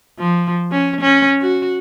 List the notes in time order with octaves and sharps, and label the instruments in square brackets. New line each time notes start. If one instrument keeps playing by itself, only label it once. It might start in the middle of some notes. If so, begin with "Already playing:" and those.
[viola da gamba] F3
C#4
C#4
F#4